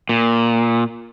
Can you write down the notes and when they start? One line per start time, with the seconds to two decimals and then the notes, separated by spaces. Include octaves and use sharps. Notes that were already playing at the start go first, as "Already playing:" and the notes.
0.09 A#2